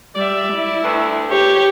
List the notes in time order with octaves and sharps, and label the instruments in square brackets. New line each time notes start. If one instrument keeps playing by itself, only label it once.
[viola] G3 E5 [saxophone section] D5
[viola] E4
[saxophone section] D2 B4
[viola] G4 C#5